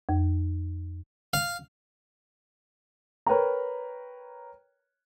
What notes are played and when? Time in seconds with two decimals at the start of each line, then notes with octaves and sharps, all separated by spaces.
0.09 F2
1.33 F5
3.27 A#4 B4 C#5 G5 A#5